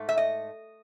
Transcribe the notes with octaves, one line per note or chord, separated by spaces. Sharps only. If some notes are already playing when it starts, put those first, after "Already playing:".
Already playing: G#2 A3
E5
D#5